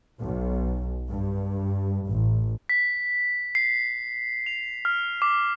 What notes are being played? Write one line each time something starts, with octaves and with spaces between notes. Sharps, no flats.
B1
G2
A1
B6
C7
F7
F6
D6